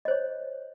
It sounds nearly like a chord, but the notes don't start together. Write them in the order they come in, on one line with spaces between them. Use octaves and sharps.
D#5 C5 C#5